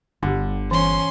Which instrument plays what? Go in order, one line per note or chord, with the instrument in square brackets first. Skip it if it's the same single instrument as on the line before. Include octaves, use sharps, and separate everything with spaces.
[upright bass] G1 [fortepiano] D3 G3
[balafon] E3 [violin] C#4 C6